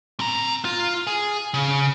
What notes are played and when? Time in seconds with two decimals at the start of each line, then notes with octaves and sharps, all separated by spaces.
0.20 C4 A#5
0.65 F4
1.07 G#4
1.54 C#3